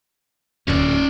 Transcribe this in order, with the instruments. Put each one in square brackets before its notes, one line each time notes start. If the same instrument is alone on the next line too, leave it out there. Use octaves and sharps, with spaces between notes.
[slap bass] D1 D2 A#2 [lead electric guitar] C#4 D5